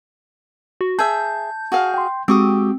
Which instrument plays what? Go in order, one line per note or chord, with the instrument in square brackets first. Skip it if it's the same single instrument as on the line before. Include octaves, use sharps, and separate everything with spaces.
[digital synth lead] F#4
[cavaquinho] G#4 E5 [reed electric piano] A5 [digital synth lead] G6
[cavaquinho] F#4 G#4 F5
[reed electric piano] G5 C6
[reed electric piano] G#3 F#4 [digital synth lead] C4 [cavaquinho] G4 C#6 D#6